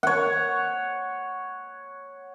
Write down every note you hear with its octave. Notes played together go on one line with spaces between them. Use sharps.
C#5 F#5